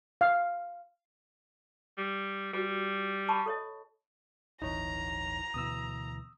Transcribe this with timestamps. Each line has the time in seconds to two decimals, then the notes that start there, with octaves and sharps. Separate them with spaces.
0.21 F5
1.98 G3
2.53 G3 F#4 B4
3.29 A5 B5 C#6
3.46 A4 C#5 D#5
4.62 D1 G1 E3 D#4 C#5 A#5
5.54 D2 B2 E3 D#6 E6